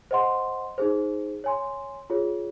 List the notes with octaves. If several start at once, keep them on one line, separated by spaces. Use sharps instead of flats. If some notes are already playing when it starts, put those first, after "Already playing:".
C5 D#5 F#5 C6
D#4 G#4 C5
C#5 G#5 C6
F4 G#4 C#5